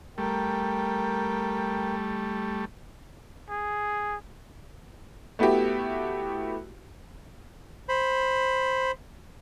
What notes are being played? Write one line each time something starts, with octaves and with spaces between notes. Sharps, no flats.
G3 A3 A#4 G5
G#4
A3 B3 E4 F#4 G4
C5 B5